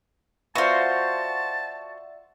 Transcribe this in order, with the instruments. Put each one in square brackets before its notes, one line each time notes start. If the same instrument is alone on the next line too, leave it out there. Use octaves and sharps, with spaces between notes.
[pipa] B3 F4 [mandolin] F#4 C5 [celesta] D5 E5 E6 [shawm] A5